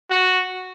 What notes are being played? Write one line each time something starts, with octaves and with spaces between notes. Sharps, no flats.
F#4